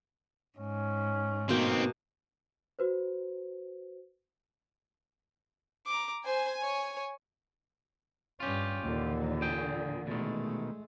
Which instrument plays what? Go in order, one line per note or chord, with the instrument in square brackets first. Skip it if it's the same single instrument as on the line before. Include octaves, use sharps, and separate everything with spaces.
[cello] G#2 [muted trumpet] C#4
[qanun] B2 A#3 G5 [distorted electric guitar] D#3 C4
[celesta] F#4 B4 C5
[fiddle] A#5 D6
[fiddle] C5 [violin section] G#5
[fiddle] C#5
[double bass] G2 C#4 [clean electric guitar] F4 G4
[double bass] D#2 [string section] A#2 D3 E3
[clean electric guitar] G#4 G5
[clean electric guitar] B2 D#3 [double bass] G#3 A3